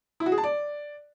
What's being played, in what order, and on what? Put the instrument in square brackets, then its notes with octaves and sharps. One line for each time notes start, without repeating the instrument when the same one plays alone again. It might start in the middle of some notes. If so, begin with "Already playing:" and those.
[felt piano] E4
F#4
G#4
A5
D5